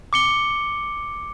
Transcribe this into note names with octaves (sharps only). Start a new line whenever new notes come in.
D6 C#7 G7